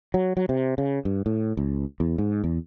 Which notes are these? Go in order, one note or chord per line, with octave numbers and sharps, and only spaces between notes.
F#3
F#3
C3
C#3
G2
A2
C#2
E2
G#2
E2